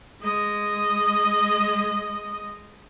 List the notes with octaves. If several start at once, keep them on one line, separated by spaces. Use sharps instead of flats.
G#3 D#5